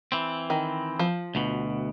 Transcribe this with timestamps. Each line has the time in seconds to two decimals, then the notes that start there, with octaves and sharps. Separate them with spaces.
0.12 E3 C4
0.50 D#3
0.99 F3
1.35 D2 B2